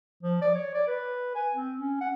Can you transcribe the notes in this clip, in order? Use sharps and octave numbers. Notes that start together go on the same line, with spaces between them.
F3
D5
C#5
D5
B4
G#5
C4
C#4
F#5